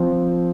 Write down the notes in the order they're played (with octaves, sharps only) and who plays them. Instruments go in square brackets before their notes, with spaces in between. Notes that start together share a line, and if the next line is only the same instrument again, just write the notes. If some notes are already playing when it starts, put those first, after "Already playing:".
Already playing: [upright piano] F3 C4